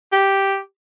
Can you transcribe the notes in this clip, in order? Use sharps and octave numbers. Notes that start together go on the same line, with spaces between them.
G4